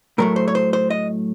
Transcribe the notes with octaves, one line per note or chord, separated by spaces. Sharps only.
A2 F#3 A3 A#4
C5
C#5
C5
C5
D#5